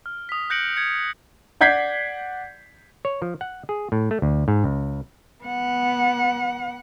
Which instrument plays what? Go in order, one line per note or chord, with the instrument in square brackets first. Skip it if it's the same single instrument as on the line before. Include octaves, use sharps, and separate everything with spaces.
[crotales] F6
D#6 B6
F#6 G6 A#6 C#7 D7 F#7
G#6 C#7
[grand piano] D5 F#5 G6 G#6 B6 C7
[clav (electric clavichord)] C#5
F3
F#5
G#4
A2
A3
D2
G#2
C#2
[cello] B3 F#5